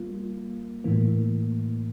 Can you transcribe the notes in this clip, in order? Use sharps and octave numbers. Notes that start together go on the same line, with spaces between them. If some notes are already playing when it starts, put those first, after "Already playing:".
Already playing: G3 A#3 F4
A2 E3 A#3